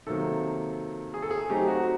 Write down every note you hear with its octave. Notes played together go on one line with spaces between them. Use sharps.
C3 D#3 F#3 A#3 A4
G#4
A4
G#4
F#3 A3 C4 D#4 G4
F#4